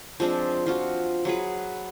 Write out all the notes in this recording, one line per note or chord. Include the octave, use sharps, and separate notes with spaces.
F3 G#3 C4 D4
F3 F4 F#4
F#3 G#4 B4